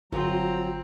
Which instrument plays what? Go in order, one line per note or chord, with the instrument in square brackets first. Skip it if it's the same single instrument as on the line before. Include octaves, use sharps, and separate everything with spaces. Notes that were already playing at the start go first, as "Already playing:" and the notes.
[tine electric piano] G1 [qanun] F3 [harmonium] F#3 A#5 [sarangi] C4